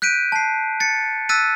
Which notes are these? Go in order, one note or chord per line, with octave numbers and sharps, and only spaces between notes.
F#6 G6 B6 D7 D#7
A5 C7
A6 C#7
E6 F#6 A6 B6 D#7